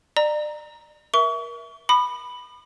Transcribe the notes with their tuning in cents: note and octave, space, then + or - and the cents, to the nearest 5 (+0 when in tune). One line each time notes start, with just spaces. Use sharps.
D5 +35 A#5 +0
A#4 +25 E5 +0 C#6 +35
B5 +0 D#6 -45